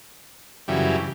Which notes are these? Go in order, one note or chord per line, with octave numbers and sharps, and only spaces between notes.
F#2 C#3 E3 G3